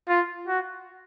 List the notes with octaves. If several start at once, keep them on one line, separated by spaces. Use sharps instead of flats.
F4
F#4